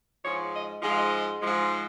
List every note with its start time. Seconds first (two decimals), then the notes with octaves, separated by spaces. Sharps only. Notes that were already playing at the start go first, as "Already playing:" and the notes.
0.24 G#2 F3 G#3 C#5
0.54 D#5
0.82 G#2 F3 G#3 D#5
0.90 F5
0.98 D#5
1.41 G#2 F3 G#3